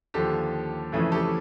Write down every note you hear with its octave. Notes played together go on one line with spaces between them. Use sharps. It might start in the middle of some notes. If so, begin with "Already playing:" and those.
D#2 D3 F3 G4 A4
F2 C#3 E3 A3 C#4
G4 A4